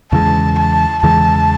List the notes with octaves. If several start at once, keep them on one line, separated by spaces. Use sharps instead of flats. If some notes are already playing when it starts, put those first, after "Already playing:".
E2 C#3 E3 G#3 A5
A5
E2 C#3 E3 G#3 A5